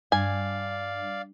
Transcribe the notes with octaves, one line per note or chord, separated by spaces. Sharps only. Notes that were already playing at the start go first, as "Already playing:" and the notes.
G2 D5 F5 G#5